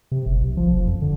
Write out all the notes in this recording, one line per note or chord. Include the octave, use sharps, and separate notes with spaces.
C3
F#1
B1
F3
F1
F2
D3